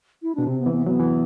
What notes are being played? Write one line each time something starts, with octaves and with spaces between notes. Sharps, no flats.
E4
B2 D4
C3 C4
B3
E3
B3
F#3 B3
E3